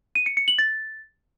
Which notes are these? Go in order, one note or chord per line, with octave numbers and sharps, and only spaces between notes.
D#7
C#7
C#7
F#7
A6